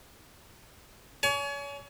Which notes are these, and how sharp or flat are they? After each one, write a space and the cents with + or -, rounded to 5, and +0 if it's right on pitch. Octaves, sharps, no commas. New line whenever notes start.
C#5 +35 G#5 +35